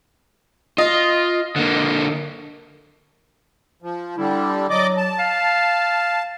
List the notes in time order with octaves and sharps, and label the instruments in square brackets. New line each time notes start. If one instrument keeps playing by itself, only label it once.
[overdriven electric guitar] F4 [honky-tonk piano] D#5
[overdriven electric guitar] D3 A#3
[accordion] F3
[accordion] D3 G3 [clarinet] E4
[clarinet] F#3 [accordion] D5 D#5 D6
[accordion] A5
[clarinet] F5